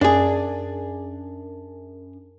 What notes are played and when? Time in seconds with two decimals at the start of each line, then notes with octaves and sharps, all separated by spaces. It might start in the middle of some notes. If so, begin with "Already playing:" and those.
0.01 F#2 D4 G#4